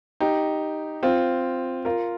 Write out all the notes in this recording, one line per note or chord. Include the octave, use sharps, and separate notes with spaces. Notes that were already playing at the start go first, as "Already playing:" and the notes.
D#4 G4
C4 F4
F4 A#4